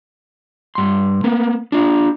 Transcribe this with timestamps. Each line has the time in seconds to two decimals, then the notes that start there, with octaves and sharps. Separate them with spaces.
0.75 G2 C6
1.24 A#3 B3
1.72 D4 F4